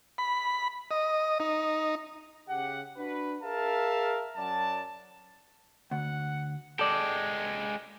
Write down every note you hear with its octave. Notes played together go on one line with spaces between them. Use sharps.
B5
D#5
D#4
C#3 G4 F#5
D4 F#4 B4
G#4 A#4 E5 F5 A5
F#2 F#3 D5 A5
D2 F#5
G#3 G4 A4 D5